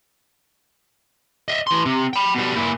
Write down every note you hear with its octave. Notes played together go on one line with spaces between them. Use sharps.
D#5 E5
E3 C6
C3
G5 B5
B2 G3
A#2 E4